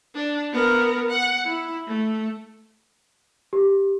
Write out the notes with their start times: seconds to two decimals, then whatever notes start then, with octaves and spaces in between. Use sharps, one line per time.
0.15 D4
0.53 B3 A#4
1.10 F#5
1.45 E4
1.87 A3
3.53 G4